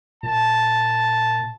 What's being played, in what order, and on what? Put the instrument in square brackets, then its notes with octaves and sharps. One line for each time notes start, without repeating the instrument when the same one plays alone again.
[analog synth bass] A#2 [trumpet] A5